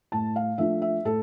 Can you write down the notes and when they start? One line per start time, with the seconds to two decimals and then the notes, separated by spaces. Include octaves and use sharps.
0.12 A2 A5
0.36 F5
0.58 F3 A3 D4 F4 E5
0.82 E5
1.04 A2 A4